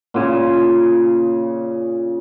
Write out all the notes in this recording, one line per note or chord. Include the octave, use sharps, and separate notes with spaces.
A#2 C#3